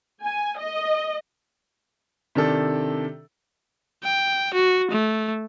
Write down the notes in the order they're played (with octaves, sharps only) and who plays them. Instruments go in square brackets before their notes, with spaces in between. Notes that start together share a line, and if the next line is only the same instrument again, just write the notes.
[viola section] G#5
D#5
[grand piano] C3 D#3 D4 A4
[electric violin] G5
F#4
A3